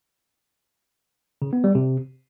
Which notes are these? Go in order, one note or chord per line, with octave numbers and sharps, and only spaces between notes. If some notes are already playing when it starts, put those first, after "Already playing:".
C#3
B3
G3
C3